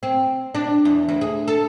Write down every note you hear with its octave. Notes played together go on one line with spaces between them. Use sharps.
C4
D4
E2
D2
G#4
A4